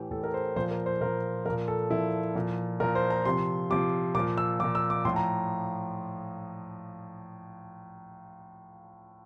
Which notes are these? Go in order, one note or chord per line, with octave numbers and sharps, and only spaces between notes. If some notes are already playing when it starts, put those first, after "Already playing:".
Already playing: A2 E3 G4
A2 E3 A4
A#4
C5
A#2 F3 C5
A#4
C5
A#2 F3 A#4
A#2 F3 A#4
A4
A#2 F3 E4
A#2 F3
A#2 F3 A#4
C5
A#5
C3 F3 C6
C3 F3 D6
A#2 F3 D6
E6
A#2 F3 D6
E6
D6
A2 F3 C6
A#5